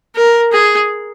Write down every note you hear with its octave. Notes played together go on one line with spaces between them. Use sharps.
A#4
G#4